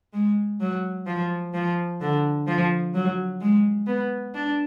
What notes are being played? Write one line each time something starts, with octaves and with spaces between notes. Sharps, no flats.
G#3
F#3
F3
F3
D3
F3
F#3
G#3
B3
D4